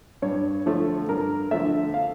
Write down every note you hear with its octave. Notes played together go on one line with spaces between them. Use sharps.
G2 C#5
D3 F3 A3
G2 A#4
D3 F3 A3 E5
F5